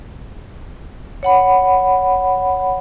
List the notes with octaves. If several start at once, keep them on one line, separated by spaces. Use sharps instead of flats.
C#5 F#5 B5